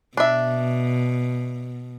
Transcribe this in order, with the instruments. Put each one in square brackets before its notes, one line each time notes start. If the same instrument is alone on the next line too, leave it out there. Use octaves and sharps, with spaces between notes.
[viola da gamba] B2 [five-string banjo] D4 E5